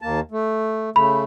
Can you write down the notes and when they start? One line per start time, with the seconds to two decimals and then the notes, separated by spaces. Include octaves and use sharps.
0.02 D#2 A#3 A5
0.31 A3
0.96 C#3 A3 B5